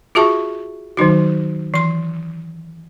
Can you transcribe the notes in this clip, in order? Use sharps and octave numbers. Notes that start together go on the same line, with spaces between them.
F4 F#4 G#4 E5 A5 C#6
D#3 F#3 D#4 F#4
E3 C6